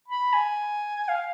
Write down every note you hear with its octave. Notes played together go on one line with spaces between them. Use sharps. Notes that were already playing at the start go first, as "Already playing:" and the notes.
B5
G#5
F5